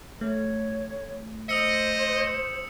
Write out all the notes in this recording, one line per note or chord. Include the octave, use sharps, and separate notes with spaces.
A3 C#5
C5 D#5 D#6 E6 C#7